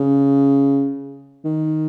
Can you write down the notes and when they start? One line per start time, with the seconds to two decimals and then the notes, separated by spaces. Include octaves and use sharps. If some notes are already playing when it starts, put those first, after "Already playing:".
Already playing: C#3
1.45 D#3